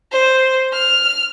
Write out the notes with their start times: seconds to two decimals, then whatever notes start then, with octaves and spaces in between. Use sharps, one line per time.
0.12 C5
0.73 F6